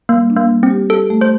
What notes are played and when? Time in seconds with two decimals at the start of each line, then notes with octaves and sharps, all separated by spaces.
0.09 G3 A#3
0.30 D4
0.37 A#3
0.50 G3
0.63 C4
0.70 G4
0.90 G4 A4
1.10 A3
1.21 C5